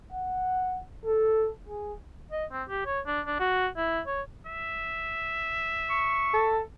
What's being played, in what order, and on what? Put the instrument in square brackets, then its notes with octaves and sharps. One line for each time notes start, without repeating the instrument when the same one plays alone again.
[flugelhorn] F#5
A4
G#4
[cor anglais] D#5
C4
G4
C#5
D4
D4
F#4
E4
C#5
[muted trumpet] E5
[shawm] C#6
[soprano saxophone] A4